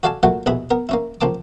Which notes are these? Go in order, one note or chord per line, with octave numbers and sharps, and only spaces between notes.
F#4 A4 D5 F5 G#5 A5
A#2 F#3 A3 F#5
A#1 D#2 B2 E4 G#4 B5
B3 A#4
A#3 C#4 E4
C#2 F3 A#3 A5 D6